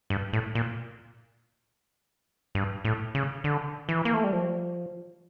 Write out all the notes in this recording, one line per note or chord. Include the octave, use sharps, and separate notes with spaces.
G2
A2
A#2
G2
A2
C#3
D3
E3
A#3
A3
G3
F3